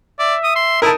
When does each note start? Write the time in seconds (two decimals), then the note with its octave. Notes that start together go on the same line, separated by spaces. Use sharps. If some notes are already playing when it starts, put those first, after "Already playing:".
0.19 D5 E5
0.44 D#6
0.56 C6
0.82 D#4 E4 A#4 A5